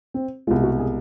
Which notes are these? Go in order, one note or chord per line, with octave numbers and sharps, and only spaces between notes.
C4
C2 B2 G#3 F4
F#4
G#4